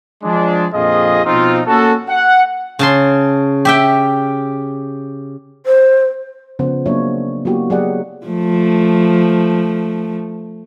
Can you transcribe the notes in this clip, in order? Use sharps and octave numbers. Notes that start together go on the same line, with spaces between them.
F3 G#3 D4
A#1 F2 F4 G#4 D#5
B2 F3 C4 D#4 F4
A#3 C#4 F#4 A4
F#5
C#3 A5 C6
G4 E5 G5
C5
C#3 F3 B3 C5 F#5
F#3 A#3 C4 D4 C#5 E5
F#3 A#3 B3 E4 F#4 G4
F#3 G4 G#4 D5 D#5 F#5
F3 A3